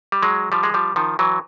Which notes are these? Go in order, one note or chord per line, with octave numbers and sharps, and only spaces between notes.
G3
F#3 G#3
F3 G3
G#3
F3 G3
D#3 F3
E3 F#3